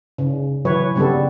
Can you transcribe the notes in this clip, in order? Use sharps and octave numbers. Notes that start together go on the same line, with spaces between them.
C#3
E3 F#3 B4 C#5
C#3 G3 B3 A4